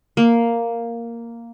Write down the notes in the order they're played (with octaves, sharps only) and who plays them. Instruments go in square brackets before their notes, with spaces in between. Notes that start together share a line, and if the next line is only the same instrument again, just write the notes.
[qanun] A#3